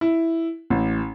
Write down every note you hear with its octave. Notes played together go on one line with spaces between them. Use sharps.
E4
A1